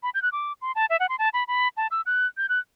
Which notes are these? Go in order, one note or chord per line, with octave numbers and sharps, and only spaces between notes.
B5
G6
F#6
D6
C6
A5
E5
F#5
C6
A5
B5
B5
A5
E6
F#6
G6
F#6